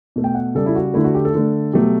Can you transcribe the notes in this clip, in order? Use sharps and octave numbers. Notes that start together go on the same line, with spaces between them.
B2 A3
G5
F#5
C#3 G3 A4
E4
F#4
D3 A3 E4
F#4
G4
A4
D3 A3
B2 F#3 A3 G4